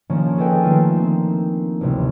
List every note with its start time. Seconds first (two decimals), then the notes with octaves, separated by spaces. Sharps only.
0.10 D#3 F3 A#3 C#4 D4
0.37 G#4 A4 B4 D#5 G5 G#5
0.63 D#3 A3 A#3 D4 F4
0.96 C4
1.81 A1 D2 C3